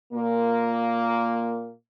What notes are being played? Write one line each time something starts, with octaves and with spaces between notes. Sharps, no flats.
A#2 A#3